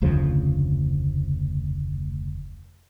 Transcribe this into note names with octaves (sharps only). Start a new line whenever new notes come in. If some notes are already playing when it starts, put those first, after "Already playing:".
F1 D2 C#3 F3